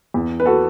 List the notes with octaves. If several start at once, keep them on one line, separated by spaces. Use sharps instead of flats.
E2
B4
F#4 A4